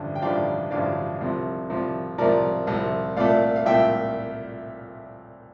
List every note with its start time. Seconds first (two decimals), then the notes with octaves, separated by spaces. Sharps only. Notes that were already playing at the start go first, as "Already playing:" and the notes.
Already playing: A1 G2 D3 F3
0.15 G5
0.22 A1 G2 D3 F3 D5 F5
0.71 A1 G2 D3 F3 D5 F5
1.21 C2 C3 F3
1.70 C2 C3 F3
2.18 C2 C3 F3 A#4 D5
2.67 C2 C3 F3
3.16 C2 A#2 A3 D5 F5
3.56 F5
3.66 C2 A#2 A3 E5 G5